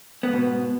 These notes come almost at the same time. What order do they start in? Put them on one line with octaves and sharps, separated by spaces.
B3 G#2 B2